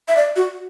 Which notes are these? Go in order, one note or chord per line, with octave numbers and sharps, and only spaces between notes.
E5
D5
F#4